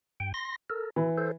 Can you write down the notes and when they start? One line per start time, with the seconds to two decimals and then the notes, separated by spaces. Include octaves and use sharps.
0.20 G2 G5
0.34 C6 A#6
0.70 A4 A#4
0.96 E3 E4
1.18 A4 C5